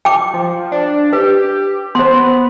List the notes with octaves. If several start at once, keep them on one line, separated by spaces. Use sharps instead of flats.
G5 D6
F3
D4
G4 B4
B3 C5 C6